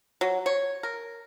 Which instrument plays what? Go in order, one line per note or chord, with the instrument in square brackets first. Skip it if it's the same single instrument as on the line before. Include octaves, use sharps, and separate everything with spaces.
[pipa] F#3
C#5
A#4